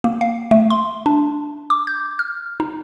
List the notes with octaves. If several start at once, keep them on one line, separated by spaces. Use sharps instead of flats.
A#3
F5
A3
C6
D4
D6
G6
F6
D#4